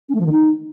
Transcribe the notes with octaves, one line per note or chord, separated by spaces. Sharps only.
C#4
A3
F3
D#3
D#4